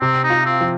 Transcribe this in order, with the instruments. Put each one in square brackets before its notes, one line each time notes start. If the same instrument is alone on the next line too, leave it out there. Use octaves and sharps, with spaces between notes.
[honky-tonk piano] C3 [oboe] C4
[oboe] D#4
[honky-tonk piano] F4
[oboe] C4
[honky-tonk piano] F3